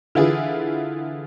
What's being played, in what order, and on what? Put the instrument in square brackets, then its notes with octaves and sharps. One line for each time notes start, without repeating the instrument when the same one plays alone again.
[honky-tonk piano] D3 E3 E4 F4 G#4